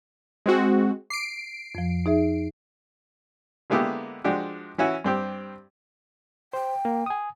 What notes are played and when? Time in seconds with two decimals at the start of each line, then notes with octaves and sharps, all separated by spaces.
0.46 G#3 C4 F#4
1.10 D6 C7 D7
1.75 F2 F3
2.06 D#4 G#4 E5
3.70 D3 G#3 A#3 B3 E4 G4
4.24 F3 G#3 D4 F#4 G4
4.78 E3 C#4 E4 F#4
5.04 G2 C4 G4
6.53 C5 G5
6.85 A#3
7.06 G#5 D#6